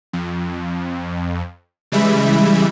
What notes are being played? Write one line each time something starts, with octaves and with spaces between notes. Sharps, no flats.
F2
C#3 E3 G3 G#3 E5 B5